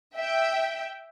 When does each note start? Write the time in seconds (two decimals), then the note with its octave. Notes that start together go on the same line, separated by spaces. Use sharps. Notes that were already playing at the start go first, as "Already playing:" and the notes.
0.16 E5 G5